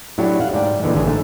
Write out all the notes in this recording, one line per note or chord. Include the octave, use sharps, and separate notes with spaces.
A2 F#3 D4 E4 F#4 G4
F5 F#5
G#2 D5 G5
A#2 D3 E3 G#3
A1 D3 G#4 G#5
G#2 A3